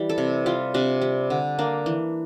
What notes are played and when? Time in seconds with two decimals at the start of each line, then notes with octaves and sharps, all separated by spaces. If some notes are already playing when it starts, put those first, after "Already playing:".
Already playing: E3 G3
0.09 A4
0.18 C3
0.46 G3 F4
0.74 C3 D4
1.01 G3
1.30 D3
1.59 A#3 D4
1.86 E3